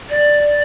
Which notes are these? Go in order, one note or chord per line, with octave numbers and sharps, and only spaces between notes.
D5